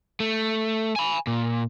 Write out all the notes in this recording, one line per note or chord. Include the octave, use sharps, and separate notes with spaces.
A3
G#5 B5
A#2